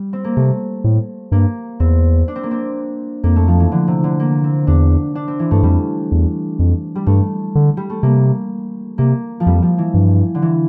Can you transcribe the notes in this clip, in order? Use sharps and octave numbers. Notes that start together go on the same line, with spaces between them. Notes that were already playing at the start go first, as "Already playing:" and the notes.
Already playing: G3
C4
A#3
C3 A3
A2
G2 A#3
E2 C4
D4
C4
A#3
C4
F2 A#3
A3
F3
E3
D3
C3
D3
A#3
C4
E2 D4
D4
C4
E3
G2 A3
F2 G3
E2
F2
G3
G2 A3
D3
G3
A3
C3 A#3
C3 A#3
F3
F2 G3
F3
E3
G2
D3
E3